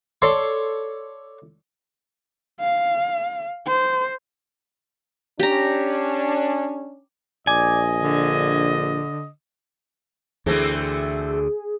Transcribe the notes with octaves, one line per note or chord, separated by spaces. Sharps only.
A4 C#5 D5 C6
F5
C5
C#4 D4 G4 A#5
A#1 D5 D#5 G#5
D3
D2 D3 E3 A3 C4 G#4